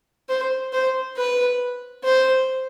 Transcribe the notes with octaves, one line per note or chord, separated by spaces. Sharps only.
C5
C5
B4
C5